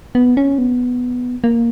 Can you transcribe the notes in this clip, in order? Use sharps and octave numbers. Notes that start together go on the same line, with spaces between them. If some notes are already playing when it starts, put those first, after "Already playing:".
B3
C#4
B3
A#3